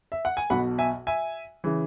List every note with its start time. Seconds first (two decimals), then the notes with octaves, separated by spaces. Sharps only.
0.12 E5
0.25 F#5
0.37 G#5
0.50 B1 B2 F#5 B5
0.78 E5 G#5
1.07 E5 G#5
1.64 C#3 E3